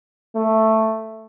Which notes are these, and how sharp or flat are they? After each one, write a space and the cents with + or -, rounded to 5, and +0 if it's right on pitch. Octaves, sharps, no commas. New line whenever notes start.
A3 +5